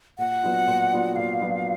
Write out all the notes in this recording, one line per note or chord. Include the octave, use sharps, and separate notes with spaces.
A#2 F#5
F#3 B3 D4 F4
A#2
F#3 B3 D4 F4
A#2 F5
F#3 B3 D4 F4